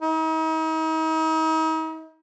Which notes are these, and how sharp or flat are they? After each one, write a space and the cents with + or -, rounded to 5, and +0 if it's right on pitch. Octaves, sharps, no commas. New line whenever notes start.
D#4 +40